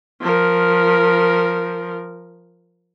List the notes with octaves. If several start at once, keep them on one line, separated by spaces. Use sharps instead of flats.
F3 A#4